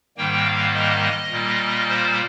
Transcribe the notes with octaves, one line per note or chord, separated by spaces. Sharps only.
G#2 D#3 G3 A#3 G5
F5
D#5
A#2 G3 A#3
C5